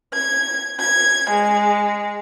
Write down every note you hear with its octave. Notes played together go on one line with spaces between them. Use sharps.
G#6
G#6
G#3